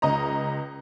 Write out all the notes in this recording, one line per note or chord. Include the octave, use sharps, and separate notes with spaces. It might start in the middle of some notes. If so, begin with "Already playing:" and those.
C#2 D#5 A#5